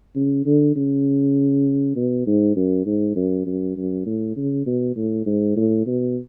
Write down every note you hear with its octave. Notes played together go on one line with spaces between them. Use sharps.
C#3
D3
C#3
B2
G#2
F#2
G#2
F#2
F#2
F#2
A2
C#3
B2
A2
G#2
A2
B2